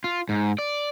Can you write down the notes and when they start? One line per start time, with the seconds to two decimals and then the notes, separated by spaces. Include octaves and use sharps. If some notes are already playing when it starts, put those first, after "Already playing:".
0.04 F4
0.29 G#2
0.58 D5